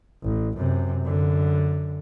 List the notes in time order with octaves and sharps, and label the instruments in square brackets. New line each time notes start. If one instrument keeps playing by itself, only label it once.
[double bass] A1
F#2 C3
F#2 D3